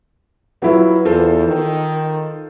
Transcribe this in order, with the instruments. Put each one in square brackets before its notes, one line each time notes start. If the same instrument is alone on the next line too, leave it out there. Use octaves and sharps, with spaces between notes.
[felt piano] F#3 E4 F4 [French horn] B4
[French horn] E2 [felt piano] F4 A4 C5
[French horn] D#3